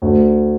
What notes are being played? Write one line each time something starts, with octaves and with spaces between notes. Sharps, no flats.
D2